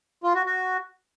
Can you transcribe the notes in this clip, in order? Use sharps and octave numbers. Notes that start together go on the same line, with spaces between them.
F4
F#4
F#4